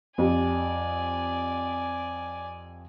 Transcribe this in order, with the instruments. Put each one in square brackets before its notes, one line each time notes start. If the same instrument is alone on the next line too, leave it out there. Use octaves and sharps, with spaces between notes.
[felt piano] F2 G4 [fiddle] D5 G#5